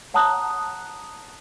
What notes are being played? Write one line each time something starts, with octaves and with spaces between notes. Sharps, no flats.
C#5 F#5 A5 A#5 D#6 F#6